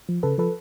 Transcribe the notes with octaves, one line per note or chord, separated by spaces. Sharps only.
F3
C#3 A4 B4
F3 A4 B4